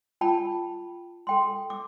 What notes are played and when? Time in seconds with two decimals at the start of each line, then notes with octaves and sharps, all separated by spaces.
0.21 F4 G5 A5 B5
1.27 A4 G5 C6
1.70 D6